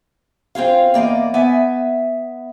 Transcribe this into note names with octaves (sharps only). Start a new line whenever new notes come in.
C4 F4 G#4 F5
E2 A#3 D5 D#5
B3 E5 G#5